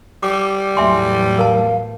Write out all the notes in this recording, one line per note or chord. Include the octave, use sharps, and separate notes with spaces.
G3 D6
E2 A2 F#3 E5 G#5 C6
A#4 F5 A5